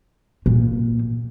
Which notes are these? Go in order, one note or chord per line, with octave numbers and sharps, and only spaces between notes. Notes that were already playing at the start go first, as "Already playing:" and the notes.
A#2 A#3